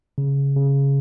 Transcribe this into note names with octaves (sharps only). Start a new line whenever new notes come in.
C#3
C#3